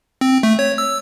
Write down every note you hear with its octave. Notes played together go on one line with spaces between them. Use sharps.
C4
A3
C#5
E6